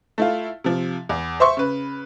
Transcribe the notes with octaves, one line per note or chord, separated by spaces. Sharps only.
A3 E4 F4
C3 F3
E2
C5 E5 C6 C#6
C#3 B4